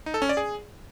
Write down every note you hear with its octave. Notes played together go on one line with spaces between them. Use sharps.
D#4
A4
C#4
D5
G#4